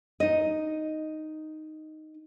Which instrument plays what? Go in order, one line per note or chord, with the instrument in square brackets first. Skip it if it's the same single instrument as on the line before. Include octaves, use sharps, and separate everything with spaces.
[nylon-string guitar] D#4 D#5